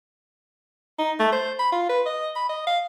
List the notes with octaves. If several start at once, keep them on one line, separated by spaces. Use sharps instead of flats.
D#4
A3
C5
B5
F4
B4
D#5
B5
D#5
F5